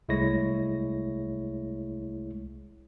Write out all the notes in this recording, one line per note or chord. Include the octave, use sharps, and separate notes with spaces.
C2 G#3 A3 E4 C#5 A#6